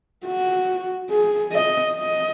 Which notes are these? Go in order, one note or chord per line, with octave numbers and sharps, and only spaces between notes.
F#4
G#4
D#5
D#5